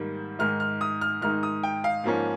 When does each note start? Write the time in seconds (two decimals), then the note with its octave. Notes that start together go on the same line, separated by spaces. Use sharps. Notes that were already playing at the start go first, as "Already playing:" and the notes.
Already playing: G#2 D#3 G3 A#3
0.39 G#2 D#3 G#3 D#4 F6
0.60 F6
0.81 D#6
1.01 F6
1.21 G#2 D#3 G#3 D#4 F6
1.43 D#6
1.63 G5
1.84 F5
2.04 G#2 F3 A#3 C#4